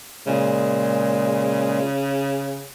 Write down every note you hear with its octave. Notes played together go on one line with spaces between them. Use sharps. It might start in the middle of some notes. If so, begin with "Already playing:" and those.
A#2 C#3 G#3